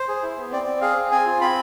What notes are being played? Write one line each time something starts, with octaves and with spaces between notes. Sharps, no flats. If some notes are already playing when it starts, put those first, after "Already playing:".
Already playing: C5
G#4
E4
B3
C4 D5
C4
G#4 F5
C4
C4 G#5
F4
C4 B5